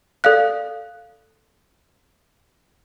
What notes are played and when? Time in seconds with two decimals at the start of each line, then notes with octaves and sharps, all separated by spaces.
0.24 A4 D5 F5 F#6